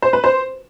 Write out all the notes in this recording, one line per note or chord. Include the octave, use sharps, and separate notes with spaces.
C5
B4
C5